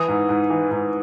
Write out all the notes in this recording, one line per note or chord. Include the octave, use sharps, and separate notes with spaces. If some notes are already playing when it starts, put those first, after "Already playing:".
Already playing: E3 D#6
G#2
G#2
E3
G#2